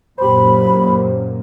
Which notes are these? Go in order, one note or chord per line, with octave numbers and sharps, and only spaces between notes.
F#2 A#2 A#3 G4 C5 B5